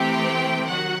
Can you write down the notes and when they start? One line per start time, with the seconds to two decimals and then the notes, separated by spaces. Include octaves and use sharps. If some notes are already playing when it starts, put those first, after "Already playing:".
Already playing: C3 E3 A3 C4 G4 G5
0.68 D#3 F#3 F#4 F#5